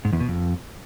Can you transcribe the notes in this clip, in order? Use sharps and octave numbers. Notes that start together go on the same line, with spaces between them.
G#2
E2
B2
F2